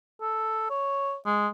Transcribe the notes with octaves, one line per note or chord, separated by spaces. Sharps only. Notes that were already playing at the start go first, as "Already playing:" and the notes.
A4
C#5
G#3